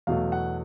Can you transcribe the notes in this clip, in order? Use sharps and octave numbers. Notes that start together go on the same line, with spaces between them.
E2 B2 F#3 A3 F5
F#5